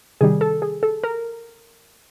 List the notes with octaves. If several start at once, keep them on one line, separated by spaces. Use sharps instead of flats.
C3 D#3 G3 G#4
A4
G#4
A4
A#4